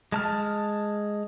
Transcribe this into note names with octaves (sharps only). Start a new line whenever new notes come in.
G#3 A5 F6